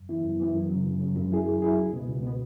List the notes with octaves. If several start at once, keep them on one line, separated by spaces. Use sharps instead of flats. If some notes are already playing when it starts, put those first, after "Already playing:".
Already playing: F#2
E3 B3 E4
F#2
E3 B3 E4
F#2
C#3 F#3
F#2
C#3 F#3
F#2
F#3 E4 G#4
F#2
F#3 E4 G#4
C#2
B2 B3
C#2
B2 B3